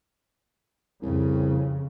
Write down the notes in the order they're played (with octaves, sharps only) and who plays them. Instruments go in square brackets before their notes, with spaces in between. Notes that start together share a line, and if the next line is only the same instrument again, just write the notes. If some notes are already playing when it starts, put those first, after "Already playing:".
[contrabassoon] C2 [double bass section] F2 C#3